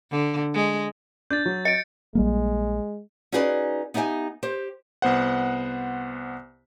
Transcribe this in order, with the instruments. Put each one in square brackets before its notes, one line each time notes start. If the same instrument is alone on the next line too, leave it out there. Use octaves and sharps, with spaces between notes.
[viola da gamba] D3
G#3
[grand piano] D4 [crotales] G6 A6
[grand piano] F#3
[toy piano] D#5 [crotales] C#7 D7
[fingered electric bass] A#1 G3 A#3 [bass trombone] G#3
[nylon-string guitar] C#4 D#4 F#4 G#4 B4 D5
B3 D#4 G4 E5 G#5
G4 C5
[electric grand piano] C2 B3 C5 F#5